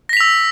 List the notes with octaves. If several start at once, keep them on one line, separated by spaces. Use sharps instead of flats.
E6 A#6 B6 F7